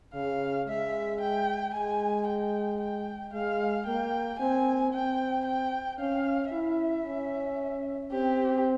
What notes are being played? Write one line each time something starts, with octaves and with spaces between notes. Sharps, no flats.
C#3 F5
G#3 E5
G5
G#3 G#5
G5
G5
G#3 F5
A#3 G5
C4 G#5
C4 G5
G5
C#4 F5
E4 E5
C#4
C4 G4